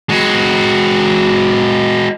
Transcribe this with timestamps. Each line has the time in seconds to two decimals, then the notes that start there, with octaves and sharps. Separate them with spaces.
0.09 G#3 F#4